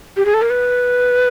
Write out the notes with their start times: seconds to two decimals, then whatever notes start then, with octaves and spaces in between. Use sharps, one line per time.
0.17 G4
0.25 G#4
0.34 A4
0.42 A#4
0.50 B4